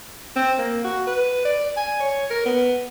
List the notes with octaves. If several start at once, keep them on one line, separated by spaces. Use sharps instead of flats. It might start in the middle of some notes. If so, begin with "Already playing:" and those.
C4
A#3
F#4
B4
D5
G#5
C#5
A#4
B3